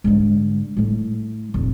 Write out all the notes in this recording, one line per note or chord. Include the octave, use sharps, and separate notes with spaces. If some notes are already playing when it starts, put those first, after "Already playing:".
G#2 D3
A2 A3
F1 A#2